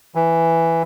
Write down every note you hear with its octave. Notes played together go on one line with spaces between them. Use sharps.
E3